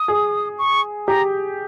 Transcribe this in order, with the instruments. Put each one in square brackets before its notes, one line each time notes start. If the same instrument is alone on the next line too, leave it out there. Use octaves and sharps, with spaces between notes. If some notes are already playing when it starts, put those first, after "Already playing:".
Already playing: [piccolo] D#6
[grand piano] G#4
[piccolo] C#6
[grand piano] G4 [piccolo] A#5